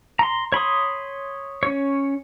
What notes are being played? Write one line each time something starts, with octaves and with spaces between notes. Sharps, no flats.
A#5 C6
C#5 B5 C6 D#6
C#4 C#5